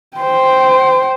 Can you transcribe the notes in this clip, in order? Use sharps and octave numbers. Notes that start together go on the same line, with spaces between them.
C5 G5